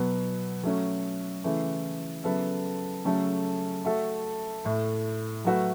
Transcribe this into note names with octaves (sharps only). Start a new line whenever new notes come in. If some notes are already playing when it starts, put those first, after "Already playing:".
Already playing: B2 F#3 B3
F#3 A3 C#4
C#3 E3 A3
C#3 F#3 B3 A4 E5
C#3 F#3 A3 C#4 A4
A3 F#4 A4 E5
A2 A3 E4
F#3 A3 F#4 B4 E5